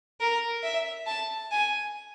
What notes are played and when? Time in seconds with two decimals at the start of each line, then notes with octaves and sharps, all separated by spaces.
0.20 A#4
0.63 E5
1.07 A5
1.51 G#5